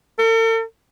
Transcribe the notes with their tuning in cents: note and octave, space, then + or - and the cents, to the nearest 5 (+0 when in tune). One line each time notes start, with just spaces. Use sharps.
A4 +45